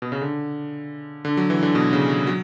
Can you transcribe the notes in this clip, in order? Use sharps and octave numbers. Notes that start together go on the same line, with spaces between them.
B2
C#3
D3
D3
F#3
E3
D3
B2
C#3
F#3
F#3